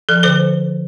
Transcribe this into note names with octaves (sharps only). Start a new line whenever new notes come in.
F3 A4
D3 A4 C5